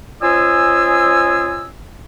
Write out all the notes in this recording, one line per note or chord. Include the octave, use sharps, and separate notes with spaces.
C#4 F4 C5 D#5 G#5 E6